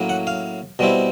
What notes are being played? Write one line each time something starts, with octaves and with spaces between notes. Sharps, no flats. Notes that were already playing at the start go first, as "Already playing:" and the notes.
Already playing: A2 F#3 A#3 C#4 E4
F#5
F5
B2 G3 C4 E4